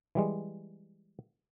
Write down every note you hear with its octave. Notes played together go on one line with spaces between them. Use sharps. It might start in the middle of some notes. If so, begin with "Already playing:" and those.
E3 G3 G#3